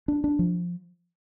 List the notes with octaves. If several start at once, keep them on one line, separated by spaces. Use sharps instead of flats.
D4
D4
F3